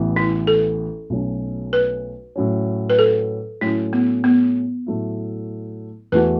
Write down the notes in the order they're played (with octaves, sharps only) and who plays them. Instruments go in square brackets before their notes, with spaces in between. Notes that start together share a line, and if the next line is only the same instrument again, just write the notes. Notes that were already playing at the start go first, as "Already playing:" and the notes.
Already playing: [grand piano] A1 A2 E3 B3
[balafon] E4
A4
[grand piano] B1 B2 A3 C#4
[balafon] B4
[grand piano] A2 F#3 C#4
[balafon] B4
A4
[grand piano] A2 F#3 A3 C#4 [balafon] E4
[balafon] B3
B3
[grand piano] A2 F#3 A3 E4
[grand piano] E2 E3 A3 F#4 [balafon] B4